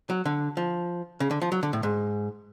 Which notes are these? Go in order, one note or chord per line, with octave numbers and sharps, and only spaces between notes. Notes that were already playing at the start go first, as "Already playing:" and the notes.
F#3
D3
F3
C#3
D3
F3
F#3
D3
A2
G#2